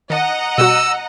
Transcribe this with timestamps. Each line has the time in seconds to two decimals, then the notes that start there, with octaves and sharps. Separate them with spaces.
0.10 D#3 D#5 F#5 A5 A#5
0.58 B2 G3 F#4 E6